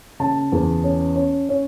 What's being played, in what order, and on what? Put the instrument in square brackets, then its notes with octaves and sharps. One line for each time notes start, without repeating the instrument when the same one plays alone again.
[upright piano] C#3 A5
E2
C#4
C#4
C#4